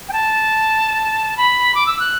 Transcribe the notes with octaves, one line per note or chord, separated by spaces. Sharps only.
G5
A5
B5
D6
E6
F#6